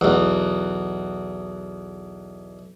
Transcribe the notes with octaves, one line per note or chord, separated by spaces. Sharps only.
B1 E2